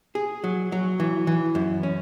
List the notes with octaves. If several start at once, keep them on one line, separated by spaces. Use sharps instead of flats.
G#4
F#3
F#3
E3
E3
F#2
C#4